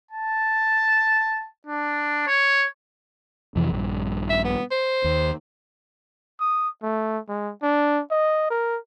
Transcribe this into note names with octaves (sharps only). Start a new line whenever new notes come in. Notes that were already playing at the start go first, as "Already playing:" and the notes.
A5
D4
C#5
F2 C3 E3
A#1 G2
E5
B3
C5
D#2
D#6
A3
G#3
D4
D#5
A#4